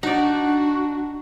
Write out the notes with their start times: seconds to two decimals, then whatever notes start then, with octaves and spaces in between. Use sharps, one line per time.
0.03 D4 D#4 F#4 D5